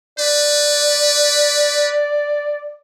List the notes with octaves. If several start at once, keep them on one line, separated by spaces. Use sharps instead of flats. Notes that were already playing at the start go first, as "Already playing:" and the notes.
B4 D5